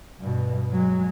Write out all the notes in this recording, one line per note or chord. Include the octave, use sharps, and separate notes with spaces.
G2 B2
F#3 G#3